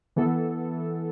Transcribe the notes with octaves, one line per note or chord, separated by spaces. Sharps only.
E3 B3 A4